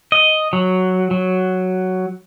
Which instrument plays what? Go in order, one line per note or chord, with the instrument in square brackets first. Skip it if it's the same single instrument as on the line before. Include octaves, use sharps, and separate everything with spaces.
[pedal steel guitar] D#5
F#3
F#3